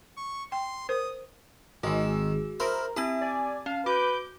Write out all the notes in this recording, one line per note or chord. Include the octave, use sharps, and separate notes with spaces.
C#6
G5 C6
A#4 C5 D#6
G#1 D#3 G#3 F#4 G#4 E6
E4 A#4 C5 D#6
C4 E4 G4 A5
D5 G#5
C#4 F5
F#4 B4 D6 G6